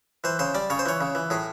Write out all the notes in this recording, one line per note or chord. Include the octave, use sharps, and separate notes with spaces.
E3 C5
C#3 C5
G3 D5
C#3 C#5
C5
E3 C#5
C#3
E3
A2 G#4